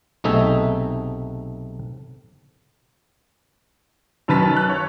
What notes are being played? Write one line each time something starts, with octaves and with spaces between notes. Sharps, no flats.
B1 C3 A3 D#4 G#4 E5
F#2 D#3 B4 A5 A6 B6
F#6
C#5